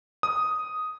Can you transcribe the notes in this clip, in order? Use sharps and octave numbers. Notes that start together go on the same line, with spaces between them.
D#6